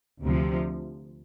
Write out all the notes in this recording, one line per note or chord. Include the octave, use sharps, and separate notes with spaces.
D2 C3 F3